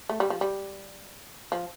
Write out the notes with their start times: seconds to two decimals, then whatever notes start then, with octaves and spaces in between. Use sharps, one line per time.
0.09 A3
0.20 G3
0.30 F3
0.41 G3
1.52 F3